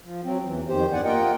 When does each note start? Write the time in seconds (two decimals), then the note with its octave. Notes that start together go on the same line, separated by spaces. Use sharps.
0.01 F3
0.24 F#3 C4
0.45 E2 E3
0.68 F2 D#3 G4 C5
0.92 G2 B3 D5 F#5 G#5
1.04 A#3 F4 A#4 D#5 F#5 G5